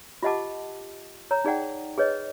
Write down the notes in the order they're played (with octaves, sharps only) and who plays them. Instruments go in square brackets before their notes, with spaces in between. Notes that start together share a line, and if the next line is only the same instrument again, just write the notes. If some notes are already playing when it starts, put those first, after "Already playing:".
[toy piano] F4 G4 D#5 F#5 A5 D6
C#5 A#5
D#4 G#4 D5 F#5 G5
G#4 B4 C#5 D#5